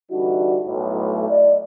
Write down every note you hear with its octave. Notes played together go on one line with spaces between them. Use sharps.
D3 E3 G3 D4 D#4 F#4
B1 A2
D5 D#5